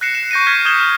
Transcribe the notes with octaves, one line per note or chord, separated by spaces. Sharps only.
F#6 A#6 C7 C#7 E7
E7
C#6 G6 A#6 C7 D#7
F6 G#6 B6
D#6 G6 G#6 C#7 E7 G7
F6